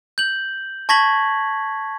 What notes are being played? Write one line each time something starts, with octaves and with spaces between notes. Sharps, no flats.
G6 F#7
A5 C#6 G#6 A#6 B6 F#7